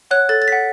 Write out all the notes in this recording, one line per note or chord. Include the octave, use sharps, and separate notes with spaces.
C#5 F#5 F#6
A4 A6
A6
C#5 F#5 B6